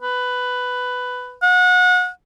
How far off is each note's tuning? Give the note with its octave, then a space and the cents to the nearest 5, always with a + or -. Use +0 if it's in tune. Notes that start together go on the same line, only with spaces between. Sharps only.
B4 +10
F#5 -30